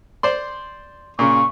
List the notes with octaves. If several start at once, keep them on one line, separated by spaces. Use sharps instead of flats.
C5 D5 C6
A#2 C#3 C#6